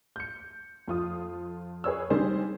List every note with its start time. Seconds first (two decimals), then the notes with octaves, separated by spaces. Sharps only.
0.16 G6 C#7
0.88 F2 F4 D#6
1.84 G#4 B4 C#5 E6
2.10 D#3 G3 C4 D4 G#4 C5